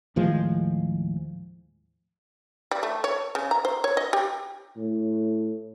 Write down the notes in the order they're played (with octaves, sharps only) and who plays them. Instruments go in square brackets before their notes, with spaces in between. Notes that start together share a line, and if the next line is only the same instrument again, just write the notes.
[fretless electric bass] D#2 A2 F3 G#3
[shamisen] G3
A3
C#5
C#3
A#5
C5
C#5
D#5
G4
[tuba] A2